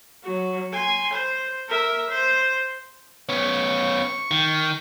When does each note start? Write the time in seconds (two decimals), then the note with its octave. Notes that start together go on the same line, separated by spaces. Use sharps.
0.24 F#3 F#4
0.73 G#5 C6
1.14 C5
1.69 A#4 E5
2.10 C5
3.29 B3 C#4 C#6
4.31 D#3